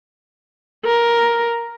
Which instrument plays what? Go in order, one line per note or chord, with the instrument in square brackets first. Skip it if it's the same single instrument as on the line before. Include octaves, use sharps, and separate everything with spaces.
[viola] A#4